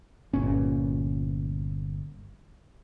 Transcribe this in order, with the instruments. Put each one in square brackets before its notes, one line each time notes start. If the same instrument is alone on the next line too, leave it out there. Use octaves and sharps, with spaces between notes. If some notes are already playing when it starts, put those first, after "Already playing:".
[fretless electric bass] G1 A#2 C#4